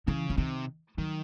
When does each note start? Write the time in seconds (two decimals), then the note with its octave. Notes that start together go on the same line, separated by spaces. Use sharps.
0.07 C#3 E3
0.30 E3
0.37 C3 D#3
0.98 D#3 F#3